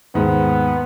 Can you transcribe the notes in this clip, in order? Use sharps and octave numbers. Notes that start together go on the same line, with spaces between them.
D#2 G#2 B3